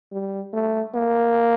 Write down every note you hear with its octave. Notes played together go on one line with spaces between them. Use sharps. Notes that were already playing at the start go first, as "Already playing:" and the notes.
G3
A3
A#3